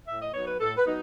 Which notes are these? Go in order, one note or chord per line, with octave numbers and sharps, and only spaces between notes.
A2 E5
D#5
F#3 B3 D#4 C#5
B4
A2 A4
B4
F#3 B3 D#4